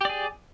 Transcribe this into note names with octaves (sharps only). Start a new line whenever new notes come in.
G4 G#4 D5